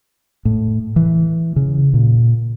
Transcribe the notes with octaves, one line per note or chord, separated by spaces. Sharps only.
A2
E3
C#3
A#2